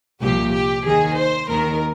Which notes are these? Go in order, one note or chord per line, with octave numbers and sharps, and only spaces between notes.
C2 A#2 F3 G4
G4
D#2 D#3 G#4
C5
D#2 D#3 A#4